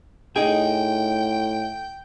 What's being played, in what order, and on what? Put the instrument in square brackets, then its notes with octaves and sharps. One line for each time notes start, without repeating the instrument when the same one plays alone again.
[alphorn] A2 [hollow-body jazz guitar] D#4 G#4 [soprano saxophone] G5